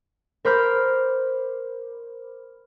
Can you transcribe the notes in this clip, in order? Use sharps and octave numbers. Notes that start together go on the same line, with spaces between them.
A#4 C5 B5 D6 F6 G6